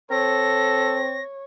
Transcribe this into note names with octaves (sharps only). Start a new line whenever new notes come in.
C4 A4 C#5 A#6